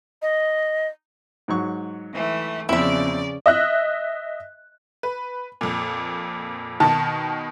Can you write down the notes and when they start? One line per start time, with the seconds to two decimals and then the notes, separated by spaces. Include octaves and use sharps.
0.22 D#5
1.48 G#2 F#3 C#6
2.13 E3 A3
2.69 E2 C#3 F3 C4 E4 D5 E5
3.46 D#5 E5 F#6
5.03 B4
5.61 F2 A#2
6.80 B2 D#3 A5